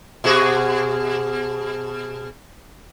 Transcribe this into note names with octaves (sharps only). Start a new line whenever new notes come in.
B2 F#4 G#4